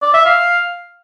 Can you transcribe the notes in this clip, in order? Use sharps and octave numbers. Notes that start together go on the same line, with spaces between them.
D5
E5
F5